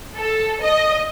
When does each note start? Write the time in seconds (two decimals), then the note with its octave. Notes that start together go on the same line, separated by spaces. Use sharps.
0.17 A4
0.61 D#5